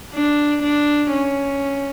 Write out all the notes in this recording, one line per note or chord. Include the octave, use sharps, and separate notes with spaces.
D4
D4
C#4